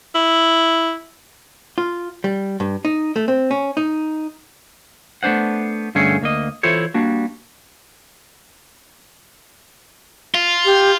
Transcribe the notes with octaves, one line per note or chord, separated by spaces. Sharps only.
E4
F4
G3
G2
D#4
A3
C4
C#4
D#4
A3 B3 D4 C5 F#5
G2 D3 A3 C#4 G#4
D2 A#3 D#5
E3 E4 F4 A4 C5 C#5
G3 A#3 D4 F#4
F4
G4